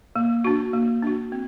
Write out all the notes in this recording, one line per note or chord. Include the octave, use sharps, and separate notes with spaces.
A#3
D4 F#4
A#3
D4 F#4
C4